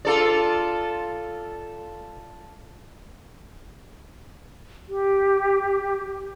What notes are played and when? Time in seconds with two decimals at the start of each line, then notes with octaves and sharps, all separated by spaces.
0.05 F4 A4 D5
4.89 G4